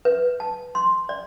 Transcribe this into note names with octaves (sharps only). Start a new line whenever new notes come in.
B4
A5
C6
D5